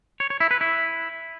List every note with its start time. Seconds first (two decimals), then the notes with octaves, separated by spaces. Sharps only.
0.20 C#5
0.30 C#5
0.40 E4
0.51 B4
0.61 E4